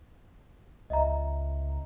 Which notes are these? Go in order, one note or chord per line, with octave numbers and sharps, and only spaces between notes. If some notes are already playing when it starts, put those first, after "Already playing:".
C#2 D#5 E5 A#5